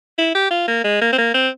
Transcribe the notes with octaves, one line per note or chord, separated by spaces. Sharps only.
E4
G4
F4
A#3
G#3
A#3
C4
A#3
C4